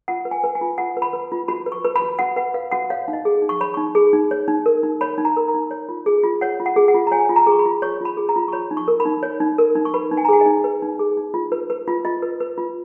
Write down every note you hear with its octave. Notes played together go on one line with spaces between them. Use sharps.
F4 F#5
B4
G#5
B4
G#5
F4
F4 F#5
B4
B5
B4
F4
F#4 B5
B4
C#6
B4
B5
F#4
F#4 F#5
B4 F#5
B4 F5
F#4 F#5
C#5 F5
D#4 F5
D#5
G#4
D#4
C#6
C#5 B5
D#4 C#6
G#4
D#4
C#5
D#4
A#4
D#4
C#5 B5
D#4
A#5
A#4
A#5
D#4
C#5
F4
G#4
F4
C#5 F#5
F4
F#5
G#4
F#5
F4
A#5
C#5 G#5
F4
A#5
G#4 C#6
B5
F4
C#5 C#6
F4 B5
G#4
A#5
F4
C#6
C#5 B5
D#4
C#6
A#4
B5
D#4
C#5
D#4
A#4
D#4
C#6
B4 B5
D#4
G#5
A#5
G#4 G#5
D#5
D#4
B4
D#4
G#4
D#4
F4
B4
B4
F4
F4 D#5
B4
B4
F4